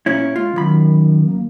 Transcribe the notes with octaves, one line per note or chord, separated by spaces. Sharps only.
A#2 C#4 E4
G#3 F4
F#2 D#3 B5
A#3